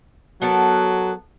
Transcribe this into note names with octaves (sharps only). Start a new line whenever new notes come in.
F#3 B3 A4 A#4